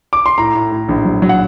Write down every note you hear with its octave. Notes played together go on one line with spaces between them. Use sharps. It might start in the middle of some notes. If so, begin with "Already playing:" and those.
D6
C6
A2 A#5
A2
A2
A#1
F#3
F#3
F#5